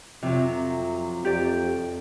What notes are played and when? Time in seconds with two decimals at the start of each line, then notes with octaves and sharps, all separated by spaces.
0.23 F2 C3 F3 F#3
1.25 F2 G4 D5